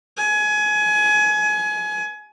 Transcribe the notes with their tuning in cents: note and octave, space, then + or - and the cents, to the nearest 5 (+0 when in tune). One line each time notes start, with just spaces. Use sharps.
G#5 +25